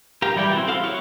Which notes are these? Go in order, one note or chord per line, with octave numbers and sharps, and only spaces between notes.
G4 A#4 F5
E3 G3 E4 D5 G5
C4 E4 F#4
C4 A4 F5 F6
E4 F#4 C#5